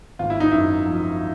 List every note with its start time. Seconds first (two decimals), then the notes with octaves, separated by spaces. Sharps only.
0.19 G#1 F4
0.30 E4
0.40 D#4
0.51 F#2 E4
0.86 F3